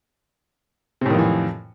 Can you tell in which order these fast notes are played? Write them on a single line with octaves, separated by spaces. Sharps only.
C3 A2 D#3 F2 E3